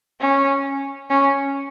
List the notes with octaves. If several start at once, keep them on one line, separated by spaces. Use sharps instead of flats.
C#4
C#4